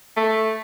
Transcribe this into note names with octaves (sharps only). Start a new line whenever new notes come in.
A3